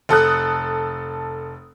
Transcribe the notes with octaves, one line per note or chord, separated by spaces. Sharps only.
F1 A4 D#6 F#6